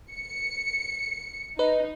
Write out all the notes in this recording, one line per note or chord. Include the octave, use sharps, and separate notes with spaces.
C#7
D#4 B4 D#5